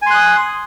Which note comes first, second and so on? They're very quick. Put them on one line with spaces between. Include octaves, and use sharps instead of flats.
G#5 C6 F#6 D#6